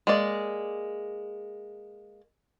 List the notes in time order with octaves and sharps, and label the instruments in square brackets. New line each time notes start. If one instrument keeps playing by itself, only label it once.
[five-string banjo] G#3 A#3 D5